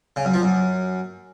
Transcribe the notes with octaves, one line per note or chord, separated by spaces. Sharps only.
C#3
F#2
F3
F#2